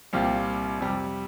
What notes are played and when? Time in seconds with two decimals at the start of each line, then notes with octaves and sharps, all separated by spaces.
0.13 C2 A#2 G3 C4 F4
0.78 F2 C3 G3